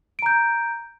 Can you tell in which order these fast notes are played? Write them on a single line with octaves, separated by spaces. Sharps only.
D7 A#5 G6